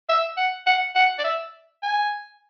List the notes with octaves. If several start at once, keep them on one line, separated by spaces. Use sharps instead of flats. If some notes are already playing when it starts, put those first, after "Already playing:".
E5
F#5
F#5
F#5
D5
E5
G#5